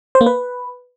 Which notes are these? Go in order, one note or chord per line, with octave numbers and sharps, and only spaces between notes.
C5
A#3
B4